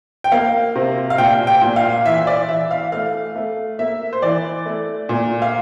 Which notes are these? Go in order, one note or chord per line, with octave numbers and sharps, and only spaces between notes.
G5
A#3 F5
C3
F5
A#2 G5
G5
A#2
F5
E3 E5
D5
E3 E5
F5
A3 F5
A3
A#3 E5
C5
E3 D5
A3
A#2
F5